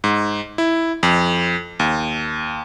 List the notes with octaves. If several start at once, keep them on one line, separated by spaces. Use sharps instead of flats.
G#2
E4
F2
D#2